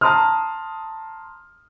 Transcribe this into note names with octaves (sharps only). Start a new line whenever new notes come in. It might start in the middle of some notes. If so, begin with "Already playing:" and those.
A5 A#5 C6 D#6 F6